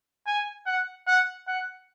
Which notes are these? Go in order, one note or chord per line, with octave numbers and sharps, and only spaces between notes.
G#5
F#5
F#5
F#5